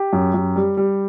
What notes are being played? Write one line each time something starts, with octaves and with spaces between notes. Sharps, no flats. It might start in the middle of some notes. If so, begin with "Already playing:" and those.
Already playing: G4
F#2
F#2
G3
G3